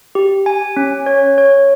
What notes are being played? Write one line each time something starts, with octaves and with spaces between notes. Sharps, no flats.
G4
G#5
C#4
C#5
C#5